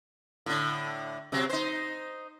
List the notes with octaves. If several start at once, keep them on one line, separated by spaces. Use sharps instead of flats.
A2 D3
C3 F#3 C4
D#4 C5